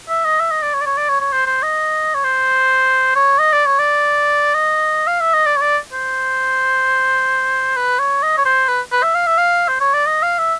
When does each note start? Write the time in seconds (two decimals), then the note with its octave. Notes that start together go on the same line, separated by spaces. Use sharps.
0.09 E5
0.25 D#5
0.40 E5
0.51 D#5
0.62 D5
0.74 C#5
0.81 D5
0.86 C#5
0.97 D5
1.09 C#5
1.21 C#5
1.32 C5
1.46 C5
1.63 D#5
2.14 C#5
2.24 C5
3.15 C#5
3.39 D#5
3.53 D5
3.66 C#5
3.79 D5
4.54 D#5
5.07 F5
5.21 E5
5.34 D#5
5.46 D5
5.57 C#5
5.61 D5
5.93 C5
7.77 B4
7.99 C#5
8.23 D#5
8.37 C#5
8.45 C5
8.69 B4
8.92 B4
9.03 E5
9.15 F5
9.27 E5
9.38 F5
9.68 C5
9.81 C#5
9.94 D5
10.06 D#5
10.23 F5
10.38 E5